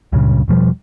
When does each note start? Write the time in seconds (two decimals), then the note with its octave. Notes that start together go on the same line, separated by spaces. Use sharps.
0.12 C#2 G2 A#2 C#3
0.48 E1 B2 F3 G3